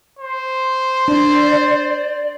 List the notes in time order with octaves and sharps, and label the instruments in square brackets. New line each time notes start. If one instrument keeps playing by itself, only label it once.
[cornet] C5
[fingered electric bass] D4 [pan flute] D5